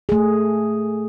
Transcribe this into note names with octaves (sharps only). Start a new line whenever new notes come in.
A3 G#4